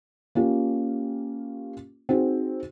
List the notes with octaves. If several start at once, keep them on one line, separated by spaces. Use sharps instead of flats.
A#3 C#4 F4 G4
C4 D#4 F#4 G#4